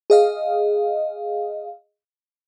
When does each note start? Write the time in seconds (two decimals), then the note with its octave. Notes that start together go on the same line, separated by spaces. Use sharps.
0.10 G#4 D#5 F5